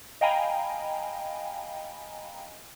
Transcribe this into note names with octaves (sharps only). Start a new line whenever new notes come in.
D#5 F5 G5 G#5 A#5 B5